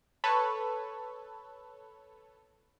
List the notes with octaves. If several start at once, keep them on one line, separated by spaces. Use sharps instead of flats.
A4 B4 C#5